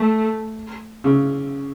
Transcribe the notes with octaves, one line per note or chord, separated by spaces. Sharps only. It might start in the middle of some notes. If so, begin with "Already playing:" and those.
Already playing: A3
C#3